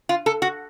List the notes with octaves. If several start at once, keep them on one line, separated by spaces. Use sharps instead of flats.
F4
A4
F#4